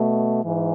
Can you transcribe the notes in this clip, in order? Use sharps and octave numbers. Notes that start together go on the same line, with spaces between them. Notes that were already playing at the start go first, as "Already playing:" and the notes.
Already playing: B2 A3
G#2 E3